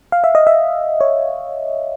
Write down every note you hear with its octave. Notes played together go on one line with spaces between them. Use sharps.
F5
E5
D#5
E5
C#5